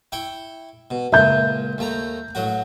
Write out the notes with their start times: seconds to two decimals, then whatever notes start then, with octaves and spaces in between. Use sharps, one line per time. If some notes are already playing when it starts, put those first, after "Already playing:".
0.12 E4 G5 C#6
0.91 B2
1.12 C#2 A#2 E5 G6
1.78 D#2 A3 A#5
2.35 A1 F#3 F#4